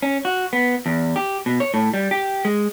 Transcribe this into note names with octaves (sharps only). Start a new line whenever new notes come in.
C#4
F#4
B3
E2
G4
B2
C#5
A2
G3
G4
G#3